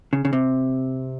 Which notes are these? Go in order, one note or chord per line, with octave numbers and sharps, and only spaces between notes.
C#3
C#3
C3